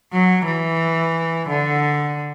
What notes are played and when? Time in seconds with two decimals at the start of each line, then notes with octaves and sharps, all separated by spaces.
0.12 F#3
0.46 E3
1.49 D3